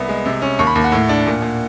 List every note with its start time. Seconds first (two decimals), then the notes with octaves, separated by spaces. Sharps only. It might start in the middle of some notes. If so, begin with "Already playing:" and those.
Already playing: C2 B3 B5
0.09 G#3
0.26 C3
0.42 C#4
0.59 D#2 C#6
0.67 B5
0.75 D#2
0.84 F#5
0.92 A2
1.09 D4
1.27 A#2
1.42 A#2